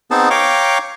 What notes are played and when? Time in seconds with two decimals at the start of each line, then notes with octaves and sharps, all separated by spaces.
0.11 B3 C4 D#4 G#4 A5
0.30 C#5 F5 G5 A#5 C#6 D6